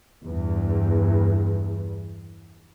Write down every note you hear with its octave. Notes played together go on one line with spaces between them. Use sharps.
E2 G2